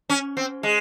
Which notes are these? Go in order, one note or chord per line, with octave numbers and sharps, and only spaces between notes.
C#4
C4
G#3